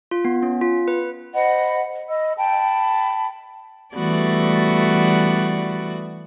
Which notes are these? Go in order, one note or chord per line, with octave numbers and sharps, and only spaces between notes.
F4
B3
C#4
F4
B4
C5 D#5 F#5 B5
D#5 B5 E6
G5 A5 B5
E3 G3 A3 B3 F#4 D5